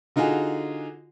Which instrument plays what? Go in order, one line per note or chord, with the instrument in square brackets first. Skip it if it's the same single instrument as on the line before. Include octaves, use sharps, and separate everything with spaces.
[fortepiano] D3 D#4 F4 F#4 G#4